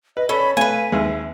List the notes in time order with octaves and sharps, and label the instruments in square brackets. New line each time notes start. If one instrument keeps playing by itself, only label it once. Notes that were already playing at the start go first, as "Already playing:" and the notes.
[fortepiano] B4 [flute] D#5
[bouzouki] C#4 [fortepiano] A4 [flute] B5
[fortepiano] A3 [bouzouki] B4 G#5 [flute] F5
[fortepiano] D#2 G#3 [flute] E5